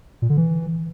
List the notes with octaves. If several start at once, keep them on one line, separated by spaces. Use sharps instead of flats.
A#2
D3
E3